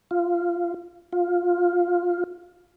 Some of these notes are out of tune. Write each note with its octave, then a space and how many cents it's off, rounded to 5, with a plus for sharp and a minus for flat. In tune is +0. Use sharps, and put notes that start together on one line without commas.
F4 -10
F4 +10